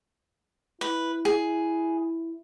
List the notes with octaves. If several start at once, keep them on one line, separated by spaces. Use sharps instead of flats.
E4 B4
G#4